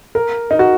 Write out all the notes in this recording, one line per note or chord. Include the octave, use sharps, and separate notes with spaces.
A#4
D#4
F#4